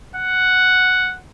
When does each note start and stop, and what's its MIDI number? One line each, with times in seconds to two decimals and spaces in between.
0.16 1.16 78